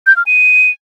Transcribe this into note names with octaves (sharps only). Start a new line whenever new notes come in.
G6
F6
D#7